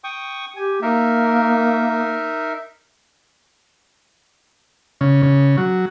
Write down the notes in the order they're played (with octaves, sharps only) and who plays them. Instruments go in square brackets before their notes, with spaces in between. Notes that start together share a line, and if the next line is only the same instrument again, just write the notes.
[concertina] G5 C#6 D#6
[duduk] G4 [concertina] G#5
[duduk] A#3 [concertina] D#4 A#4 E5
[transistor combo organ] C#3
C#3
F#3